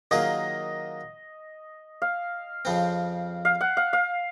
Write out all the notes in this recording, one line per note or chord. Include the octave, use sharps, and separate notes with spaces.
D#3 F#3 A#3 F4 G#4 D#5
F5
F2 C#3 F3 C4
F5
F#5
F5
F5